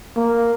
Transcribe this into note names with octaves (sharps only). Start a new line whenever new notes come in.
A#3